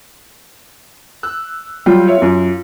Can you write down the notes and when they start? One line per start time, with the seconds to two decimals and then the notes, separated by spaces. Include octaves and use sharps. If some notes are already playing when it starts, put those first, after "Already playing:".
1.23 E6 F#6
1.86 F#3 G3 F4 G5
2.08 C#5 E5
2.22 F#2 F4